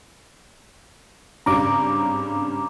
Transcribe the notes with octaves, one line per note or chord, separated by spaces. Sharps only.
G#1 G2 C#3 A#5 D6